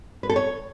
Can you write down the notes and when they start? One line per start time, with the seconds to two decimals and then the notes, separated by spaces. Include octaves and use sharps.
0.23 B4
0.29 A4
0.36 C#5